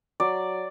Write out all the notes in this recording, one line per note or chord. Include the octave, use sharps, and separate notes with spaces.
F#3 D5